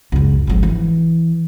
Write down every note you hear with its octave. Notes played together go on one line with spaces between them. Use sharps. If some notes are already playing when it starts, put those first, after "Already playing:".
C#2 F#2
G#1 F3
E3